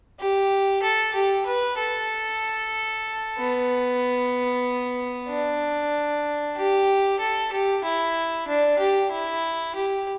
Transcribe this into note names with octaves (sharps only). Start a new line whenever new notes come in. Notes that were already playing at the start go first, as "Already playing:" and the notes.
G4
A4
G4
B4
A4
B3
D4
G4
A4
G4
E4
D4
G4
E4
G4